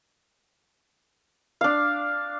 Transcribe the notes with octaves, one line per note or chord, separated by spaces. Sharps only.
D4 F5